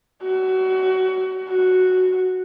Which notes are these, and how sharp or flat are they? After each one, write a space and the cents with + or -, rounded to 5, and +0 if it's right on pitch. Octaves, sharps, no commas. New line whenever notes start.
F#4 +25
F#4 +0